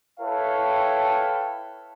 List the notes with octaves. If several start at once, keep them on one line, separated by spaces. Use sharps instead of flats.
E4 A4 B4 C#5 F5 G5